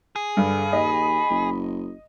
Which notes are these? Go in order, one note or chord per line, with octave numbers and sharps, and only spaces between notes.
G#4
G2 D3
D#2 D#5 B5
F#1